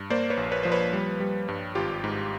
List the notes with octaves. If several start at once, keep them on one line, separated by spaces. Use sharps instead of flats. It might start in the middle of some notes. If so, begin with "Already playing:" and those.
Already playing: G2
A#3 C5 D5
B4 C#5
A#1
B4 C#5
F3 C5
B4 C#5
G3
G3
G2
G#1 F4 G4
G#2